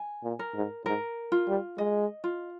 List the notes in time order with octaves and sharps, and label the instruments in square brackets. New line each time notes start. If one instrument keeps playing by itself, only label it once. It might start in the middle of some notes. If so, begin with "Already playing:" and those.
Already playing: [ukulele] G#5
[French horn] A#2
[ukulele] A#4
[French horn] G#2
[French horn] G#2 [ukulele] A#4
[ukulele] F4
[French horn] G3
[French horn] G#3 [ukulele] D#5
[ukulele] F4